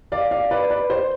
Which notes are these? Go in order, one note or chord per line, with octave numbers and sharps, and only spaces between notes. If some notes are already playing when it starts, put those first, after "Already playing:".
D5 F5
D5 F5
B4 D5
B4 D5
C5